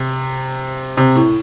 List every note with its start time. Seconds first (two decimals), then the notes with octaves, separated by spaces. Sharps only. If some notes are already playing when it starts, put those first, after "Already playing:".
Already playing: C3
0.97 C3
1.16 A2